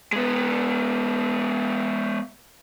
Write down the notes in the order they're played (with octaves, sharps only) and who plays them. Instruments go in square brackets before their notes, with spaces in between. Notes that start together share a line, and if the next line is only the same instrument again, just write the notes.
[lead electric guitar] G#3 B3